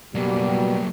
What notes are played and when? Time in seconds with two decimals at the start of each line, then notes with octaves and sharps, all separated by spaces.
0.15 B2 F#3 G3 A#3